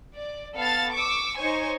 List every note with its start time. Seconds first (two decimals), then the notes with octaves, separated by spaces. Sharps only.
0.16 D5
0.57 B3 A4 F5 A5 A6
0.93 C#6 D6 E6
1.39 D#4 C5 C#5 G#5 C#6